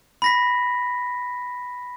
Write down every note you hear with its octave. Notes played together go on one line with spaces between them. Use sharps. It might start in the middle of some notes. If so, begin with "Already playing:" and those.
B5 A#6 B6